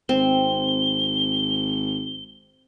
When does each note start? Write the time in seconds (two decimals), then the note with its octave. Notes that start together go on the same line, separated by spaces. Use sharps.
0.09 G#1 C4 G7